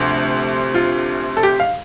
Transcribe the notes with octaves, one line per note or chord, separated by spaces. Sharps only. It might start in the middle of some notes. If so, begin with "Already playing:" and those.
Already playing: D2 C3 F3
F4
A4
G4
F5